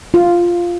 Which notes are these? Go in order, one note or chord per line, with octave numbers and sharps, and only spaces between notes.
F4